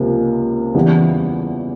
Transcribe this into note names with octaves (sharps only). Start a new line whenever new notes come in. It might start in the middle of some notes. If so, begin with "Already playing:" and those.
Already playing: C#2 C3 F3 A#3
E2 C#3 E3 G3 B3